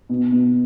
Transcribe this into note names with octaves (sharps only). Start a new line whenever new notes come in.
B2
B2